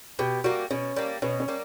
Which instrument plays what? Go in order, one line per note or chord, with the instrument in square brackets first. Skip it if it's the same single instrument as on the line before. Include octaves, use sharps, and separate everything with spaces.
[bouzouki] B2 [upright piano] G4
[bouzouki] G3 A#3 [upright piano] F#4
[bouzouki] B2 [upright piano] C#4
[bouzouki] G3 A#3
[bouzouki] B2 [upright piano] C#4
[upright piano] C#4
[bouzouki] G3 A#3